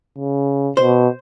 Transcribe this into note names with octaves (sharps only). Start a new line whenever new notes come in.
C#3
B2 C5